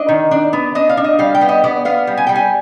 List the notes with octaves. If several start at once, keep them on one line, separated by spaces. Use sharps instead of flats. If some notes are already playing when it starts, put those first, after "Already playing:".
Already playing: D4 D#5
D#3
D4
B3
D4 D#5
F5
D4
D#5
G3 F5
G5
B3
D#5
B3 D5
B3 F5
G3
G#5
G3 G5
G#5